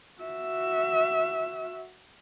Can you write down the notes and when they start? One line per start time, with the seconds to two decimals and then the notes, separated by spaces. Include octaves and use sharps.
0.20 F#4 E5